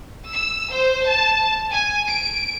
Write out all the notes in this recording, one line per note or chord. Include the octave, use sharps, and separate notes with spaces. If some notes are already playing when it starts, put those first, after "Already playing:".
E6
C5
A5
G#5
D7